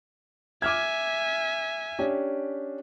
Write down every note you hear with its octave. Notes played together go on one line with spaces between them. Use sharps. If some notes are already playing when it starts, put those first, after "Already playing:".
E5 G#5 D6 F6 G#6
C#4 D4 G4